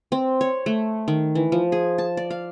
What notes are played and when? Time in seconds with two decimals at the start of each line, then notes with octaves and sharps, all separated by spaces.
0.12 C4
0.41 C#5
0.66 A3
1.08 D#3
1.35 E3
1.52 F3
1.72 G#4
1.98 A5
2.17 D5
2.30 F5